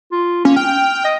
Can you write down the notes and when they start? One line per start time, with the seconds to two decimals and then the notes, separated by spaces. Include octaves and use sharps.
0.12 F4
0.45 A#3 C#4
0.56 G5 F6
1.05 D#5